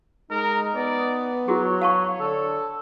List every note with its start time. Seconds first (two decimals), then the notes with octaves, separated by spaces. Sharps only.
0.31 G#3 D#4 A#4
0.76 B3 D5
1.48 F#3 E4 F#4 G#4 C#5
1.82 F5 A5 C#6
2.20 D3 A4